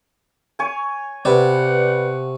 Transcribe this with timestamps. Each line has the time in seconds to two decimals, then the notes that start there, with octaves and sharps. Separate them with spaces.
0.59 C#5 G#5
1.25 C3 B4 D5 F#5